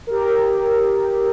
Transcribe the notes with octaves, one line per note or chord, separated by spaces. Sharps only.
G4 A#4